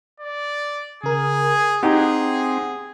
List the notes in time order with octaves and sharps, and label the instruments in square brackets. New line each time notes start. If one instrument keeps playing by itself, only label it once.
[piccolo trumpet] D5
[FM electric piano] C#3 A#4 [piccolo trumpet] G#4
[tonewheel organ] C4 [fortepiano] D#4 G4 [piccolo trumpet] G#4 [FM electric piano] F#5